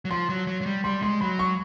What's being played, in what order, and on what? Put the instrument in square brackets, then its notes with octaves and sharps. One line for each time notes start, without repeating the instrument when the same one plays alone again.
[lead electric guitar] F#3
[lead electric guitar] F3 [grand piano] C6
[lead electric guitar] F#3
F#3
F#3
G3
[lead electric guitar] G3 [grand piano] C6
[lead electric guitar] G#3 [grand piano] C6
[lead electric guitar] F#3 [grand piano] B5
[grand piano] C#6